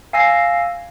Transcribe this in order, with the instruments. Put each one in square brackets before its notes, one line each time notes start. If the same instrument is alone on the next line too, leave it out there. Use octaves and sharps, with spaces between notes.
[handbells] F5 G#5 E6 A#6 C7